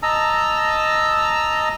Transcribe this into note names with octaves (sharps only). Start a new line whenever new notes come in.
D#5 A5 A#5 E6